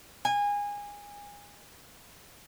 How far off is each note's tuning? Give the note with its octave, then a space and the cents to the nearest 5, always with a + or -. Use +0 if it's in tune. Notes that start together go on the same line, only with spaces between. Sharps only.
G#5 -25